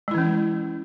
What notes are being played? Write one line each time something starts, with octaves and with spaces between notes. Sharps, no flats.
E3 G#3 C#4 E4